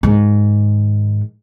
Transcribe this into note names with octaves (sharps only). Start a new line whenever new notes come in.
G#2 D#3